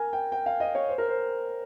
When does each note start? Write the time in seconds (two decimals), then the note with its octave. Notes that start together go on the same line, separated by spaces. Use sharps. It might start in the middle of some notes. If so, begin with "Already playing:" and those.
Already playing: A#4 G#5
0.13 G5
0.32 G5
0.46 F5
0.60 D#5
0.75 C#5
0.89 C5
0.98 A#4
1.08 C5